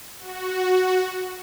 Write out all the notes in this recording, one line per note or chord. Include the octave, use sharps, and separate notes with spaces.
F#4